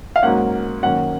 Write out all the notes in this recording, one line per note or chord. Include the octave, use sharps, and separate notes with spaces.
F5
G#2 F#3 A#3 C#4 F#5
F#1 F#2 D#3 A#3 C#4 F#5